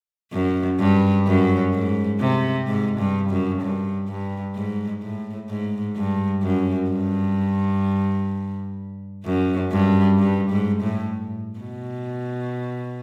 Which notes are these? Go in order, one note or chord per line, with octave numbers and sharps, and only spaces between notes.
F#2
G2
F#2
G#2
C3
G#2
G2
F#2
G2
G2
G#2
A2
G#2
G2
F#2
G2
F#2
G2
G2
G#2
A2
B2